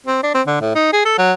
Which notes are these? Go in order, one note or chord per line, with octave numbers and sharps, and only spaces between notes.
C4
D4
C4
D3
A2
D#4
G#4
A4
F#3